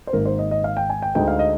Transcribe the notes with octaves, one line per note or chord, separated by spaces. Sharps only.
C5
G#1 G#2 D#3 A#3 A#4
C5
D#5
D#5
F5
G5
G#5
G5
D2 D3 G#3 D#4 G5
F5
D#5